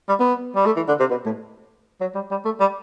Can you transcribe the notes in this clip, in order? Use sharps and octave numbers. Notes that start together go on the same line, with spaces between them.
G3
B3
G3
A3
E3
D3
C3
B2
A2
F#3
G3
G3
A3
G3